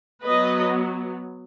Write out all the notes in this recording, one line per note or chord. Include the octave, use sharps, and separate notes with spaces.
F#3 B3 B4 D#5